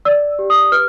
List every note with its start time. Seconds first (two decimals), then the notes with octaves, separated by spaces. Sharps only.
0.05 D5 E6
0.39 G4
0.50 D#6
0.72 B4 F6